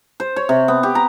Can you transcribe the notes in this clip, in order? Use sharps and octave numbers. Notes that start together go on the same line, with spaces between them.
C5
C#5
C3
B3
G4
A#5